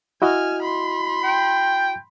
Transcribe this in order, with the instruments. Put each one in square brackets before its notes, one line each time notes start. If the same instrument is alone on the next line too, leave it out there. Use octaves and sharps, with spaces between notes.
[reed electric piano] E4 F#4 D#5 [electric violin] G#5 F6
[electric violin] B5 C6
[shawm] G5